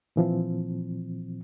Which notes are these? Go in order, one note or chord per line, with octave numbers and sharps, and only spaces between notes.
A#2 E3 F3 C4